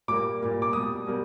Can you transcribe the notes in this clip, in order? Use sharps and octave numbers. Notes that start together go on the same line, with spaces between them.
A#2 G3 A#3 D6
A#2 G3 A#3
D6
B2 G3 A#3 D#6
B2 G3 A#3